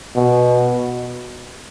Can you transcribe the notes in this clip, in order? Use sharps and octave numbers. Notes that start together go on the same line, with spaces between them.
B2